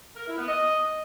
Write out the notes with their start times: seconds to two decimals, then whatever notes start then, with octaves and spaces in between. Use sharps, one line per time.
0.16 A#4
0.27 E4
0.37 B3
0.48 D#5